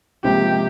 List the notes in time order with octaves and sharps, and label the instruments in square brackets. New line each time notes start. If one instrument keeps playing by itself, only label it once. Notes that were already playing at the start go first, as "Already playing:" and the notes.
[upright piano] C#2 C3 F3 A#3 [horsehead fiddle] G4